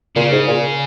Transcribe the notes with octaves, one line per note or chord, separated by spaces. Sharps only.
A#2 C#3
G#2
A#2